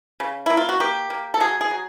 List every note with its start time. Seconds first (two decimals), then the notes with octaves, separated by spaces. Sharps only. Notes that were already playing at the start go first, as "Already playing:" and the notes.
0.20 C#3
0.46 A#3 E4
0.57 F4
0.69 F#4
0.80 A#3 G4
1.10 A#3
1.34 A4
1.40 F#3 G#4
1.61 G#4
1.71 F#3